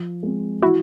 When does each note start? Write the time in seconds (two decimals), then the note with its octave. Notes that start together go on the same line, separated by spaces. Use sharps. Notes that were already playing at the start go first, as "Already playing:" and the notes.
Already playing: F3
0.23 G#3 C4
0.62 E3 E4 F#4